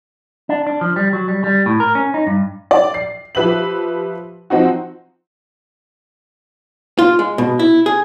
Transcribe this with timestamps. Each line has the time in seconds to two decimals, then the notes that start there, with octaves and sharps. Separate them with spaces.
0.49 D4
0.67 D4
0.81 F3
0.96 G3
1.13 F#3
1.28 G3
1.44 G3
1.66 A2
1.80 A#4
1.95 C#4
2.14 D#4
2.27 G2
2.71 D5
2.94 C7
3.35 F3 G4 B4 E5 F#7
4.50 F3 C4 D#4 F#4
6.99 F4
7.19 G#3
7.38 B2
7.59 E4
7.86 G#4